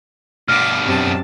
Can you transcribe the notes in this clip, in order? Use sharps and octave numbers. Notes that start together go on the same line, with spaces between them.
G2 B2 D6 F6
F#2 C3 A5